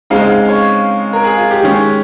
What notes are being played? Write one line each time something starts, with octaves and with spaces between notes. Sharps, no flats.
C#3 G#3 C4 D#4 F5
D#5
F5
C#5
A#4
G#4
F4
G4
D#3 G#3 C#4